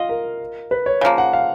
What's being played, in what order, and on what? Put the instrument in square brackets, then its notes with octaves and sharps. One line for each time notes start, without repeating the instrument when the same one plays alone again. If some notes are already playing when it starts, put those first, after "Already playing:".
Already playing: [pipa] F4 D#5 [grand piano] F5
[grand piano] A#4
B4
C#5
[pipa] C#3 F3 A#3 [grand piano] F5
[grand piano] F#5
F5